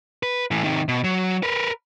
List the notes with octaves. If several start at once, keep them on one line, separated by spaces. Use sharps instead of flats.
B4
A2 E3
C3 D#3
B2
F#3
A#4 B4